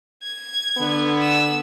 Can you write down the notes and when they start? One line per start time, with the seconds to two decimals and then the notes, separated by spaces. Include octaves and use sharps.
0.23 G#6
0.78 D3 B3
1.22 E6